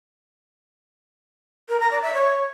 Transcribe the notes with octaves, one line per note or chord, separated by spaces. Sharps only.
A#4
A#5
D5
E5
C#5